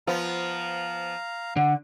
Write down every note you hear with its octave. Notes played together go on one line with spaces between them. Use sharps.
F3 B3 F5 A#5
D3 F#5